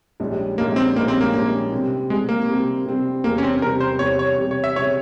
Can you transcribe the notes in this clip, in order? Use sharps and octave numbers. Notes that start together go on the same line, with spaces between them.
A#1 G#2 G3 C#4
A#1 G#2 G3 A#3 C#4
C4
A#1 G#2 G3 A#3 C#4
C4
A#3
A#1 G#2 G3 C#4
C3 G3 C4
C3 G3 G#3 C4
A#3
C3 G3 C4
C3 G3 C4
E2 C3 G3 A#3
C#4
C4
E2 C3 G3 A#4
C5
E2 C3 G3 C#5
C#5
E2 C3 G3
C#5
E5
C#3 G3 C4 C#5